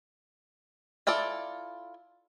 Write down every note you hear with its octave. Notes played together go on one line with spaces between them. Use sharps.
E4 F4 A4 D5